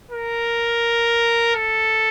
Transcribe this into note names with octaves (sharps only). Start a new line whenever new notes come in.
A#4
A4